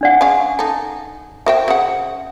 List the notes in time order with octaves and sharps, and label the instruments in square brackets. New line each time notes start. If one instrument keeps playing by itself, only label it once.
[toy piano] D4 D5 F#5
[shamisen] G#3 C#4 F5 [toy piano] G#5
[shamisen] D#4 A4
[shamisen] F#4 C5 G5 [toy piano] E5
[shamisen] C#3 F#5